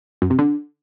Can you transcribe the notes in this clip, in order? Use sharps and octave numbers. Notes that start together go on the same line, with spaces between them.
F#2
C3
D3